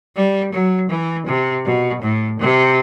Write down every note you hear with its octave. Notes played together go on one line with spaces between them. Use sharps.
G3
F#3
E3
C3
B2
A2
C3